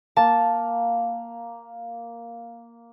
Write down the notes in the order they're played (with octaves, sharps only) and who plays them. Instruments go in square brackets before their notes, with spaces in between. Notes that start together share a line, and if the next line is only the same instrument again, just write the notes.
[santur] A#3 [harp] A5